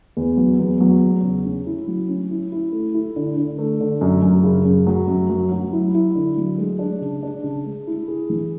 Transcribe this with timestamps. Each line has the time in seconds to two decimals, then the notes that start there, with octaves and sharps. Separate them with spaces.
0.17 E2
0.37 F#3
0.59 E2
0.80 F#3
1.01 E2
1.23 C#3
1.44 C#4
1.66 E4
1.87 F#3
2.09 C#4
2.31 E4
2.52 E4
2.72 A3
2.94 E4
3.16 D3
3.37 D3
3.58 A3
3.80 D3
4.01 F#2
4.23 F#2
4.43 C#3
4.65 F#2
4.87 F#3
5.08 F#2
5.30 F#3
5.52 F#3
5.72 E4
5.94 E4
6.15 D3
6.37 F#3
6.58 G#3
6.79 D4
7.01 C#3
7.23 D4
7.44 C#3
7.65 G#3
7.87 E4
8.08 G#4
8.30 E3